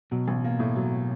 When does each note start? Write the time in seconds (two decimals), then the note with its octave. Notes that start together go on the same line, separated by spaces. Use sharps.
0.11 B2 F#3
0.28 A1
0.44 A#3
0.59 A2
0.76 F#3